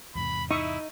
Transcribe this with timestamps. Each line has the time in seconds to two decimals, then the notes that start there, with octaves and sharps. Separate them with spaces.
0.15 E2 G#2 C3 B5
0.51 D#4 E4 E5 C#6 D#6